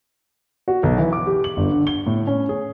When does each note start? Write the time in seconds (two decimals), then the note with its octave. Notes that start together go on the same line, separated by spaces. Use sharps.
0.68 F#4
0.83 B1
0.98 E3
1.13 D6
1.27 G4
1.44 F#7
1.57 G1
1.71 D3
1.87 G7
2.07 A2
2.27 C#4
2.49 G#4